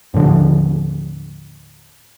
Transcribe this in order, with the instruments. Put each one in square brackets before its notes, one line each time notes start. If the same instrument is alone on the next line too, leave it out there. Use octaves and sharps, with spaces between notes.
[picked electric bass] D#2 A2 D3 F3